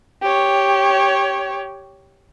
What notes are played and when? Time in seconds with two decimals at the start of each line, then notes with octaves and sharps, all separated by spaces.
0.22 G4 C#5